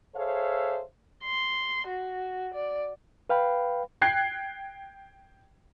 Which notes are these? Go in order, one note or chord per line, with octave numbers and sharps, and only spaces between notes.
G#4 A4 C5 C#5 E5 F5
C6
F#4
D5
B4 F5 G5 B5
G5 F#6 G#6 C7